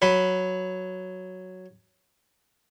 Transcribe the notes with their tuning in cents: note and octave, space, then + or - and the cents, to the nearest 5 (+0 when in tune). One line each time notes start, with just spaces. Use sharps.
F#3 +0 B4 +0